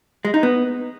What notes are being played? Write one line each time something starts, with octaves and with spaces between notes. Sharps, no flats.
G#3
D#4
B3